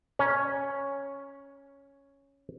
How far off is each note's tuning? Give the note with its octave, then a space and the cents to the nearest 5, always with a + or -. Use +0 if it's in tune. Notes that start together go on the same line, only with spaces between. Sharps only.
C#4 +0 A#5 +25